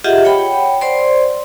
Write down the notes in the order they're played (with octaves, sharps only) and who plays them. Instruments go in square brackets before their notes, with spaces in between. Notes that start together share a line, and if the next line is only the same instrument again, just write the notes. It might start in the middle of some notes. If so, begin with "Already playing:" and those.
[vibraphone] F4 G4 G#4 D#5 E5 F#5
C#5 F#5 G5 B5
C5 D5 C6